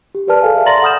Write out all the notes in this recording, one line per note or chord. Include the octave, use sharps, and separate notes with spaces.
G4
G4 A#4 B4 D5 A5 F6
G#4 A4 F5 G#5
E5 F5
D5 A#5 C6 A6 A#6 F#7
F#5 B5 D#6 F6 G6 E7